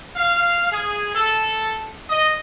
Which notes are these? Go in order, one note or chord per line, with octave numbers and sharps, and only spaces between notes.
F5
G#4
A4
D#5